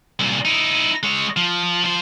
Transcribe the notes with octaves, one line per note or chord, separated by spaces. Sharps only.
C2 A#2
D#4 E4
G#3 C#5
F3
F3 C5